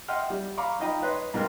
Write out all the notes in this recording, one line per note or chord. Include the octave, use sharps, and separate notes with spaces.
D#5 E5 F#5 G5 C6 F6
G3
F5 A#5 B5 C#6 D6
D#4 F4 D#5 G5 A#5 B5
B4 C#5 D#5 C6
G#2 B2 A#4 G5 C6